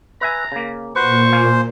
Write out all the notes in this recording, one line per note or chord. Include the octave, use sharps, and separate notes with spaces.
B4 E5 G#5 A#5
C#3 A#3
A#2 F#4 B4 C5 C#6
A#3 F5 G#5